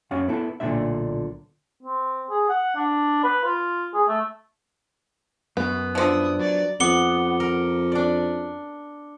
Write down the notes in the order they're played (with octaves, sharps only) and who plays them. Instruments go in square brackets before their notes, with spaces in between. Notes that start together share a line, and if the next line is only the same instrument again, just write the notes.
[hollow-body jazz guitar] F#2 C#4 F5 F#5
B3 E4 A4
B1 A#2 D3 A3 D4 E5
[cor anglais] C4
G#4
F#5
D4
B4
F4
G#4
A3
[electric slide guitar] F#2 [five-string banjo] B3
[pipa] D3 F3 [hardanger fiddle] E4 D#6
[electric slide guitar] F#3 [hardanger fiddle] D5
[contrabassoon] F2 [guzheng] B3 [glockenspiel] D6 C#7 G7
[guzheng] A#4
D4 D5